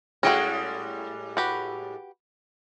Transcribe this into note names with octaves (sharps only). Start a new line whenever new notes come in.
A2 G3 G#3 C#4 F#4 D#5 G5
F#4 G4 B4